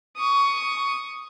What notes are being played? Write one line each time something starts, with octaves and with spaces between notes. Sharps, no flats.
C#6 D#6